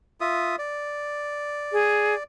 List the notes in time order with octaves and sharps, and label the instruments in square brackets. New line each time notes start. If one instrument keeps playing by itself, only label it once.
[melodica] F4 E5 D#6
D5
[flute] G#4